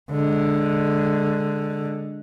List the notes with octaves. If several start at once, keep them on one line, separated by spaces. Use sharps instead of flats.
D3 G#3